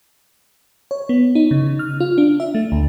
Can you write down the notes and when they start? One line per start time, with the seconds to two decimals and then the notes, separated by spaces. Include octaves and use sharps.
0.91 C#5
1.09 B3
1.35 D#4
1.51 C#3
1.79 F6
2.00 F4
2.18 D4
2.40 E5
2.55 A3
2.72 D2